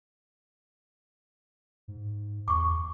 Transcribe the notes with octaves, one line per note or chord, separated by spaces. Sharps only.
G#2
E2 C#6 D6